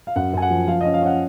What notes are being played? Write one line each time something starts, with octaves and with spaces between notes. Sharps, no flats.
F5
F#2 F#5
F#2 G#5
F#5
F3
F3 F5
C#4 D#5
F5
C#4 F#5